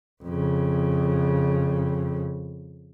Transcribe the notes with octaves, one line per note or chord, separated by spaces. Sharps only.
F2 C#3